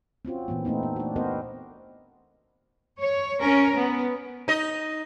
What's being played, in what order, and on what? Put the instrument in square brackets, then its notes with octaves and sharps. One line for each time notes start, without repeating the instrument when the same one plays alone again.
[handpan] C4 C#4 F4 F#4
A#2 E3 A#3 B3
A3 B3 C4 D#4
B3
D4 F#4
B3 C4 F#4 A#4 C5 D#5
[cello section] C#5
C#4 A#4
B3
[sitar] D#4 D#5